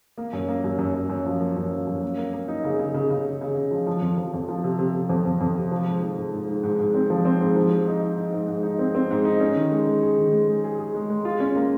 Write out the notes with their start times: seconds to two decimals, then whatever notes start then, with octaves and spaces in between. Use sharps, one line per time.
0.18 A#3
0.33 F#2
0.49 A#3
0.64 F#2
0.79 F#2
0.95 F#2
1.10 F#2
1.26 F3
1.40 A#3
1.56 F#2
1.71 F3
1.87 F#2
2.03 A#3
2.17 A#3
2.33 A#3
2.48 D#4
2.64 C#3
2.79 C#3
2.94 C#3
3.10 C#3
3.25 C#3
3.41 C#3
3.57 C#3
3.71 F3
3.87 F3
4.02 F2
4.18 F3
4.34 F2
4.49 F3
4.64 C3
4.79 C3
4.94 C3
5.09 F2
5.25 F2
5.41 F2
5.56 C3
5.71 F3
5.87 G#2
6.03 F3
6.17 G#2
6.33 G#2
6.48 G#2
6.63 G#2
6.79 G#2
6.94 C4
7.10 F3
7.25 C4
7.41 G#2
7.56 F3
7.71 F3
7.87 D#4
8.02 D#4
8.18 D#4
8.33 G#2
8.48 G#2
8.63 D#4
8.79 C4
8.95 C4
9.10 G#2
9.25 D#4
9.40 C#4
9.56 D#3
9.72 G#3
9.87 G#3
10.02 G#4
10.18 D#3
10.33 G#3
10.48 G#3
10.64 G#4
10.79 G#4
10.95 G#3
11.10 G#3
11.25 F4
11.40 C#4
11.56 A#3